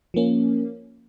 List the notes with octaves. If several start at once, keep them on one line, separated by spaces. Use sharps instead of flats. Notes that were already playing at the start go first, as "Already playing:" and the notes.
F3 A#3 C#4